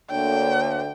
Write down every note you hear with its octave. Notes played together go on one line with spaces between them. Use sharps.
D2 D3 A#3 C#5 G5